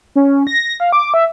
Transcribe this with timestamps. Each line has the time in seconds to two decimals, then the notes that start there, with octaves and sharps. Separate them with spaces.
0.16 C#4
0.47 A#6
0.80 F5
0.93 D6
1.14 E5